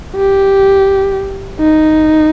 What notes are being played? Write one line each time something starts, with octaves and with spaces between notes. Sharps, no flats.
G4
D#4